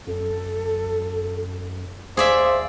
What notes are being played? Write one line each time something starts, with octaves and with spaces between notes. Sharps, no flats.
F#2 A4
D#2 G#4 C5 D5 E5 F5